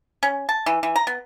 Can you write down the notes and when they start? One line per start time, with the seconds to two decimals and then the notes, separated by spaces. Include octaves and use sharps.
0.23 C#4
0.49 A5
0.66 E3
0.83 E3
0.96 A#5
1.07 B3